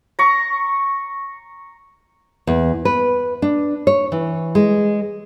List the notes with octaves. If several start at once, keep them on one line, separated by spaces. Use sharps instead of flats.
A#5 C#6
E2
B4
D4
C#5
E3
G#3